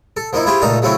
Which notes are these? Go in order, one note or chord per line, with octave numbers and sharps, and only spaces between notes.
A4
F3 A#3 D#4 E4
E4 F4 G4 G#4 C5
C#2 A#2 A3 D#4 F5
C#3 F#3 A3 C4 C#4 E4